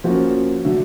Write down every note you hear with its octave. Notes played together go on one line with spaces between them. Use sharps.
F3 A#3 C#4 F#4
D3 F#3 A3